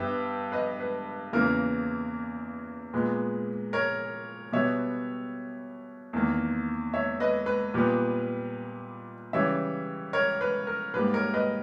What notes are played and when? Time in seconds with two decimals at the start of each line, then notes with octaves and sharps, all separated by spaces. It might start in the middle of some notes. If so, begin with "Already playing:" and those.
Already playing: G2 G3 B3 E5
0.52 B4 D#5
0.80 B4
1.33 E2 C#3 E3 A#3 A#4
2.94 A#2 G#3 B3
3.73 A#4 C#5
4.53 B2 G3 B3 C#5 E5
6.13 E2 D#3 A#3
6.94 C#5 E5
7.20 B4 D#5
7.46 B4
7.74 A#2 G3 B3
9.33 C#3 E3 G3 C#5 E5
10.13 A#4 C#5
10.41 B4
10.67 A#4
10.94 G#2 G3 A#3 B4
11.14 A#4 C#5
11.34 B4 D#5